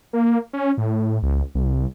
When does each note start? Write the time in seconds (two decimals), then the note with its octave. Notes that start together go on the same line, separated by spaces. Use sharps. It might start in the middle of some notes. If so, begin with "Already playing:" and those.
0.13 A#3
0.53 C#4
0.78 A2
1.22 C#2
1.55 C2